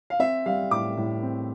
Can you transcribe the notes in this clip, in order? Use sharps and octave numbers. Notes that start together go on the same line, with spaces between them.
F5
C4 E5
G3 F5
A2 D6
A2
C4